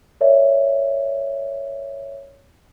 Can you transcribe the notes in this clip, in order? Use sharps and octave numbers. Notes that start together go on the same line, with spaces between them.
A#4 C#5 D5 E5